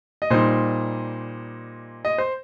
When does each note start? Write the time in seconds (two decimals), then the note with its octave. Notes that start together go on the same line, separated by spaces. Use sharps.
0.22 D#5
0.30 A#2 G3 D#4 C5
2.05 D#5
2.18 C5